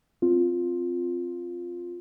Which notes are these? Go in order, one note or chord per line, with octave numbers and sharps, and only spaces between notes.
C4 F4